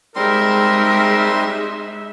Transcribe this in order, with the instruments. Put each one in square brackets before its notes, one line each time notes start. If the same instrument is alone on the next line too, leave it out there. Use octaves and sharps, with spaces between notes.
[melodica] G3 C4 C6 [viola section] G#3 D#4 E5 [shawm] A#4